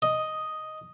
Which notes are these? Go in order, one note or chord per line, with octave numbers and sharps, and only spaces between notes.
D#5